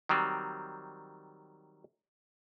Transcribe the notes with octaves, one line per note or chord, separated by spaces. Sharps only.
D#3 F#3 G3 C4